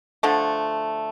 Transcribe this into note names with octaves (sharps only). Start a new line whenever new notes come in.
D3 F3 A3